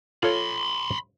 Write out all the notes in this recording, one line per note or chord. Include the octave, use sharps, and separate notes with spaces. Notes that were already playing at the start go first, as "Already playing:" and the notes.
F4 A4 C#5 B5 C6